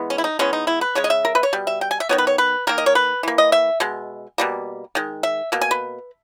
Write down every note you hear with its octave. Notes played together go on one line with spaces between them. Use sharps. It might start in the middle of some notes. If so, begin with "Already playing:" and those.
Already playing: E3 G#3 B3
C#4
E4
D#4
E3 G#3 B3 C#4
D#4
E4
B4
C#3 G#3 C#5
D#5
E5
A#4
B4
C#5
B2 G3
E5
G5
G#5
E5
D#3 G#3 B3 C#5
B4
C#5
B4
D#3 A#3 A#4
D#5
C#5
B4
E3 A#3
D#5
E5
B2 G#3
B2 G3 A#3
D#3 G#3
E5
B2 A#3
G#5
B4